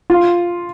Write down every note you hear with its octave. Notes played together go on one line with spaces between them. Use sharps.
F4